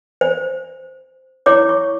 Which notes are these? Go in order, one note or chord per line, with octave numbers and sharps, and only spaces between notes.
C5
E4 C#5 D6
C#6